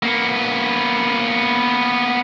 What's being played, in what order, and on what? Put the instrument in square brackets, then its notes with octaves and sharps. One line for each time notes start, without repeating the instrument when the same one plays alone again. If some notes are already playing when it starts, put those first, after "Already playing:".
[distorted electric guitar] A#3 B3